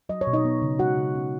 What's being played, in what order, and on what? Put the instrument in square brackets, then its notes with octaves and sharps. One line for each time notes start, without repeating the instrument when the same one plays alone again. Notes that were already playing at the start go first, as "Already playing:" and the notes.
[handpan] F#3 D#5
C#5
B2
D#4 D#5
B3
C#3
G#3 F#4 F#5
C#3
C#4